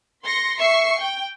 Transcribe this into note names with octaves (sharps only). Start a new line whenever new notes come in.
C6 A#6 C#7
E5 C#6 C7 C#7
G5